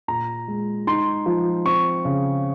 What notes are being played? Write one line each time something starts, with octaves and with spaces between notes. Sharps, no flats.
A#2 A#5
G#3
D#4 C6
F3
C4 C#6
C#3